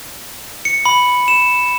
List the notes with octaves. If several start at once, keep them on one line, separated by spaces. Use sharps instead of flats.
C#7
B5
E7